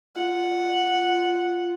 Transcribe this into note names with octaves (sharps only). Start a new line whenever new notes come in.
F4 F#5